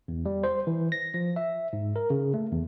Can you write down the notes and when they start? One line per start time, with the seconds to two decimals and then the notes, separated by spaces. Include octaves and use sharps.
0.08 E2
0.26 G3
0.44 C5
0.67 E3
0.92 A#6
1.14 F3
1.36 E5
1.73 G#2
1.96 A#4
2.10 C#3
2.34 A3
2.52 E2